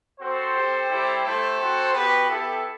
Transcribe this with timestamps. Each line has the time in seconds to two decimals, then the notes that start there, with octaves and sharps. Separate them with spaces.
0.20 C4 F#4 A4 C5
0.55 C4 G4
0.89 G3 C4 E4 G4
1.23 A3 E4 G4 A4 C5
1.59 C4 F#4
1.93 B3 F#4 G4 B4
2.28 B3 E4 G4 A4